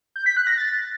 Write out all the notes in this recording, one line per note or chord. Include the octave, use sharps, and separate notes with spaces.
G6
B6
F#6
A#6
A6